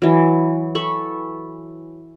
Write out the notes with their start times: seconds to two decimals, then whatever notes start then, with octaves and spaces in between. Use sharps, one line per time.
0.02 E3 F#3
0.75 A4 B5 C#6